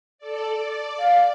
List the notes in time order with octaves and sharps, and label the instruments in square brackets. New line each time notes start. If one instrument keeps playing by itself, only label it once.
[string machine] A4 D5
D5
[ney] F5